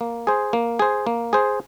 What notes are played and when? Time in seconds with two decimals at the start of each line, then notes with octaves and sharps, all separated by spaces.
0.01 A#3
0.27 G#4 C5
0.53 A#3
0.79 G#4 C5
1.07 A#3
1.33 G#4 C5